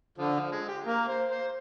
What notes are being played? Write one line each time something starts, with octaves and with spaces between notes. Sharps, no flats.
D3 F3
F3
G#3
G4
A#3 A#4
C5
C5